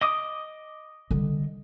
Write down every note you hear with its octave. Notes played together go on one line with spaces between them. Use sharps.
D#5 D6 D#6
D3 G3